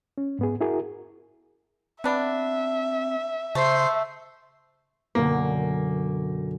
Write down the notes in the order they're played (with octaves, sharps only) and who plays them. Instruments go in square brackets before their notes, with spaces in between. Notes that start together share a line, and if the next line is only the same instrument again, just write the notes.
[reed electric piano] C#4
G#2 B3 G#4
E4 F#4 G#4 A#4
[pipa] B3 D4 [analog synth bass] C4 [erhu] E5
[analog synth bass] C#3 [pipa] A3 [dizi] C5
[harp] F#2 B2 D3 [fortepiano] A#3